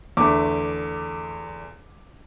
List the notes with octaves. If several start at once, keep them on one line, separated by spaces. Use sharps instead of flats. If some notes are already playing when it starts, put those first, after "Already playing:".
E2 D3 A3 D6